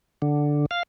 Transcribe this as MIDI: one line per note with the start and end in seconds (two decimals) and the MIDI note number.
0.22 0.66 50
0.71 0.83 77